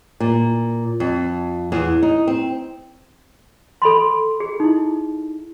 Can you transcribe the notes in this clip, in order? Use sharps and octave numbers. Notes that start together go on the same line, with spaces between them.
A#2
F2
E2
D#4
C4
A4 B5 C6
G#4
D#4 E4